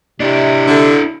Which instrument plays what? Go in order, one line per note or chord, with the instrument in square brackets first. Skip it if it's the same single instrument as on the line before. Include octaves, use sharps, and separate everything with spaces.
[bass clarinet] C3 [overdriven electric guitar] D4 E4
[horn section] D3